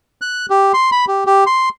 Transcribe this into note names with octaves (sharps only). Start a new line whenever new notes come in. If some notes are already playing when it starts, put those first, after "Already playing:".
F#6
G4
C6
B5
G4
G4
C6